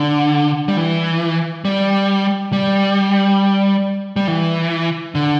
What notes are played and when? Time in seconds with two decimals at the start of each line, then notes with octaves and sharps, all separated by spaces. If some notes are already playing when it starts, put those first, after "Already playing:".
Already playing: D3
0.68 G3
0.77 E3
1.65 G3
2.52 G3
4.16 G3
4.28 E3
5.15 D3